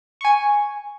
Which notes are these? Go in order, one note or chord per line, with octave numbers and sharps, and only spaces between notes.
G#5 C#6